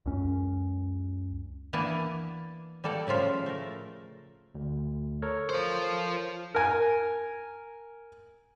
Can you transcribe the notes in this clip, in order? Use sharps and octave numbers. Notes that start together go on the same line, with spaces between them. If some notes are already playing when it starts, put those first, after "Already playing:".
C#2 F#2 C#4
E3 A#3 B3 D4 G#5 A5
G3 A#3 A4 D5 F#5
A2 C#3 F3 F4 E5
A3 A#4
D2
A4 A#4 C#5
F4 C5
A#4 G#5